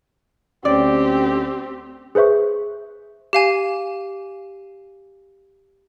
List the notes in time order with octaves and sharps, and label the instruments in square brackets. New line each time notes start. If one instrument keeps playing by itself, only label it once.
[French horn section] D2 C#4 [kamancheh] C4 G4 [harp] D5
[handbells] G#4 B4 C5 E5 C#6
[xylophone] G4 F5 G#5